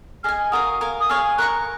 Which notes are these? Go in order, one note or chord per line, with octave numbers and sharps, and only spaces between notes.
G#4 D#5 G#5 F6
F#4 A#4 F5 D#6
A#4 F5 G#5
D#6
G#4 C#5 F5 G#5 F6
A#4 F5 A#5 C#6 F#6